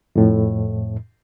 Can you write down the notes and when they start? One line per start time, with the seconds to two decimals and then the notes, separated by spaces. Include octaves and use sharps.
0.16 F2 A2